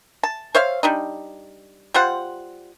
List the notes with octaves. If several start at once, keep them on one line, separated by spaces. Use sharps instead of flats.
A5
C5 C#5 E5 F5
G3 D4 D#4
G3 F4 C5 F#5